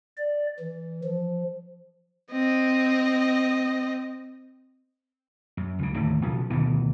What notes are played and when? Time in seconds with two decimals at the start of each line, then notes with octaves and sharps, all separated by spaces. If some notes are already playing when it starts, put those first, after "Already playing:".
0.17 D5
0.60 E3
1.04 F3
2.32 C4 D#5
5.57 F#2
5.79 C#2 C#3
5.94 D#2 A2 D3 D#3
6.21 B1 C#3 F3
6.50 D2 B2 D#3 E3